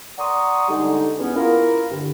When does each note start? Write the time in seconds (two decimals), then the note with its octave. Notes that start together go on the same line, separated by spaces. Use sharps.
0.18 D5 F#5 A#5 C6 C#6 D#6
0.69 D3 G3 G#3 D#4
1.19 E2 B3 C#4
1.36 A#3 E4 F4 A#4
1.90 G2 D3